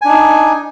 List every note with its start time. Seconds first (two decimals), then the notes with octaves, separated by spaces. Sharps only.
0.02 G#5
0.05 D4
0.09 D#4